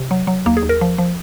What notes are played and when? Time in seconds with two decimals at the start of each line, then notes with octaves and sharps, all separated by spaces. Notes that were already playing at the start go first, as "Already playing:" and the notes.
Already playing: C3
0.11 F#3
0.27 F#3
0.46 D#2 A#3
0.57 G#4
0.63 D#2
0.69 A#4
0.81 F3
0.98 F3